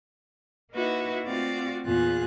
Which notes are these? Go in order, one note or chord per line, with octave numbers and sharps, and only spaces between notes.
A#3 D#4 E4 F#4 B4 E5
A3 C4 F4 F#4 D5 F5
E2 A#2 B3 F4 G#4 F#6